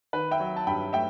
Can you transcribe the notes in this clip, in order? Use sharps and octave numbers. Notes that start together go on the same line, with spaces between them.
D#3 B4
E5 G5
F#3
A5
G2 G5 B5
A3 E5 G5